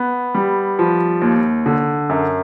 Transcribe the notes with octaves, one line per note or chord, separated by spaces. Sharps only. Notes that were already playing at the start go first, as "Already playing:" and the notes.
Already playing: B3
G3
F3
D#2
D3
F#2